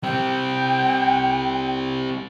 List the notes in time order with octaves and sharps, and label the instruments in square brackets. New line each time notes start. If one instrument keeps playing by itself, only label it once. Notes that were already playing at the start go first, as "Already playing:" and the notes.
[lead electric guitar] G3 C4 [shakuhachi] G5